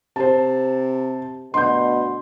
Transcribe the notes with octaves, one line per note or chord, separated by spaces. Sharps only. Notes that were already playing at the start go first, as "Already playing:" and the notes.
C3 C5 A5
D2 B2 C6 G6